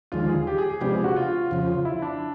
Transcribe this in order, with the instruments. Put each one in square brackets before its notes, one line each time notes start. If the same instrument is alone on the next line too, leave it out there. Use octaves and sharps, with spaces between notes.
[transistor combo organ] D#2 D3 F3 G#3 [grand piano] F4
[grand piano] G#4
G4
G#4
G#4
[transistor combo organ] C3 F3 G#3 B3 D4 [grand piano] G4
[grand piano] G4
F#4
F4
[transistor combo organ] F2 C#3 F3
[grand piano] E4
D4